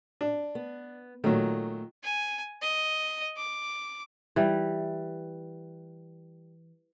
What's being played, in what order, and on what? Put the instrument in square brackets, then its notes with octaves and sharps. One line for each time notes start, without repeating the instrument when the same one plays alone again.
[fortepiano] D4
[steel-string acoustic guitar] B3
[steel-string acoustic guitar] A#2 A3 [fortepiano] D#3 F#3
[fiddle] G#5
D#5
D6
[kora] E3 G3